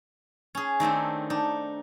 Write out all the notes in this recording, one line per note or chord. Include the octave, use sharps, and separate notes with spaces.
C#4 G#4
D#3 A3 C4 D4
D4 D#4